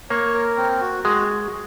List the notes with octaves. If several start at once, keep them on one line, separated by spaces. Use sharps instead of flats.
A#3 C#5
A#4
C4
F#4
G#3 F#4